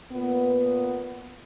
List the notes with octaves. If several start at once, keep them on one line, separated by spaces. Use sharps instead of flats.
A#2 B3